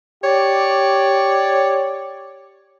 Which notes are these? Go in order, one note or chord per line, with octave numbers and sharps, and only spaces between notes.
G4 C#5 D5